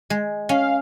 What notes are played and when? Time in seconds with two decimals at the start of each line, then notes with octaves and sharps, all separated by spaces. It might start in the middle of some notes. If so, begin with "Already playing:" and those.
0.10 G#3
0.49 C#4 F5